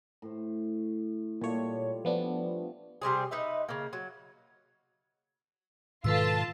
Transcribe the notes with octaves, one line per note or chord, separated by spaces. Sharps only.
A2 C5
A#2 G3 A3 F4 C#5
F3 B3 D4
C3 G3 C4 G#4
D#4 B4 E5
C#3 A#3
F#3
G#2 B2 D#3 F4 A4 B4 A5 E6